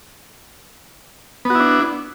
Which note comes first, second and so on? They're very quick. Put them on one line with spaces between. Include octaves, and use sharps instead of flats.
B3 F#4 E4 D4